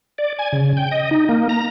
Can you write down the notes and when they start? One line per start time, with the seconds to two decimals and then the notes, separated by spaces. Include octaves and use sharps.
0.18 D5
0.39 G#5
0.52 C#3
0.77 G5
0.91 D#5
1.11 D#4
1.29 A#3
1.49 A#5